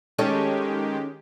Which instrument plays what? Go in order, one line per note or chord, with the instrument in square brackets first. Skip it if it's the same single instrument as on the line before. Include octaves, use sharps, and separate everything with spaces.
[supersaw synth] D#3 G#3 G4 [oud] C#4 D#4 A4